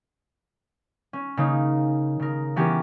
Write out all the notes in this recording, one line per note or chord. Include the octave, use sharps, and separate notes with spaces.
C#4
C#3 A#3 D#4
C#3 A#4
E3 B3 C#4 G4 G#4 A#4